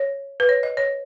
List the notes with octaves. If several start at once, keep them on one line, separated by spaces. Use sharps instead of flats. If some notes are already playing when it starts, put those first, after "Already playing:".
Already playing: C#5
B4
C#5
D#5
C#5